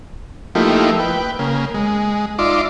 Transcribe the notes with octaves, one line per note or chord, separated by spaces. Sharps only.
F3 A3 A#3 D#4 E4 G4
B4 G5
C#3 A#3
G#3
D#4 F4 D5 E5 C6 D6